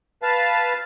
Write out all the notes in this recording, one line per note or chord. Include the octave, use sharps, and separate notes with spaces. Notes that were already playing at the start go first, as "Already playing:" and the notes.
B4 F5 A5